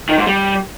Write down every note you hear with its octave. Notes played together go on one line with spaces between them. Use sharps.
D#3
G#2
G3